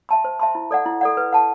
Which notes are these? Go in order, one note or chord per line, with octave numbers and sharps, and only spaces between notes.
E5 A5 C6
C5
E5 A5 C6
E4
A4 D5 F#5
E4
A4 D5 F#5
B4
F#5 A5